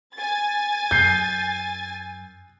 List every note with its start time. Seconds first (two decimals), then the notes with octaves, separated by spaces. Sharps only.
0.15 G#5 A6
0.91 F#2 G6 C7